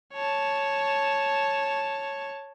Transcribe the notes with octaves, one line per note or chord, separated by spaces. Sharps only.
C#5 A5